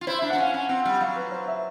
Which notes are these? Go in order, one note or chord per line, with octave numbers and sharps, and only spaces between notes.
F4
E4 C5
D4 E5
D4 F#5
C#4 F5
C#4 F#5
C4 F#5
G3 F#5
F#3 F5
B4
C5
E5